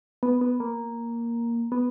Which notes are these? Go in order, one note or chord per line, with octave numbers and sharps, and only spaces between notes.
B3
B3
A#3
B3